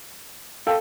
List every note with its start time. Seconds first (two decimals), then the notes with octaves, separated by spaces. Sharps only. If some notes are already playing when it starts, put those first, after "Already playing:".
0.67 A4 F5 G5